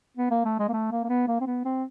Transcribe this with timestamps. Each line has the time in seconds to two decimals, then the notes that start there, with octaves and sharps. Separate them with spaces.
0.17 B3
0.31 A#3
0.45 A3
0.59 G#3
0.68 A#3
0.73 A3
0.91 A#3
1.04 A#3
1.09 B3
1.28 A#3
1.41 C4
1.46 B3
1.65 C4